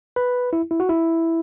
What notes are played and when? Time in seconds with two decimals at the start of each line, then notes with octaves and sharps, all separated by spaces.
0.16 B4
0.53 E4
0.71 E4
0.80 F#4
0.89 E4